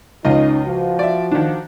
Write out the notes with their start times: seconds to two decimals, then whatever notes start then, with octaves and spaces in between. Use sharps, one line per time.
0.25 C#2 C#4 D#4 F4 D#5
0.66 F3 F#4
0.99 D5 E5
1.31 D#3 D4